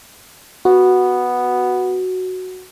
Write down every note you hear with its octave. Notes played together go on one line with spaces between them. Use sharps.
B3 F#4